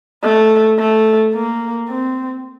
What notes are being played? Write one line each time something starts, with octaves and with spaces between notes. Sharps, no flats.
A3
A3
A#3
C4